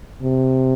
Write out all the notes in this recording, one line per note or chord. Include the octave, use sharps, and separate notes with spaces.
C3